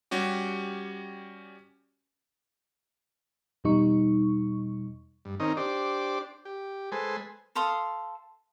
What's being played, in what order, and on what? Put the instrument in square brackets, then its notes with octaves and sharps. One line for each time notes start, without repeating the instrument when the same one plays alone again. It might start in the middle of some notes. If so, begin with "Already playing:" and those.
[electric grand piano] G3 C#4 F#4 G4
[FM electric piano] E2 B2 G3 D#4 C#6
[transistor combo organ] G2
D#3 C4 C#4 D#4 A#4 D#5
D4 G4 C5 D5
G4
G#3 A4 B4 C5 G#5
[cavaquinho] A4 F5 C6 D#6